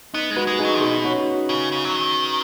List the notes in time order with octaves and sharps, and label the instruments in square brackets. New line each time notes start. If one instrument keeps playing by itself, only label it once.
[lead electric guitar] B3 [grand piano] D#4
[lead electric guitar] G#3
[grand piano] F#4 B4
[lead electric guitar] G#3
[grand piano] D#4 G#4
[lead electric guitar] F#3
[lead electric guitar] B2 [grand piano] D#4 G#4
[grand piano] C#4 F#4
[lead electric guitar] C#3
C#3
F#3
D#3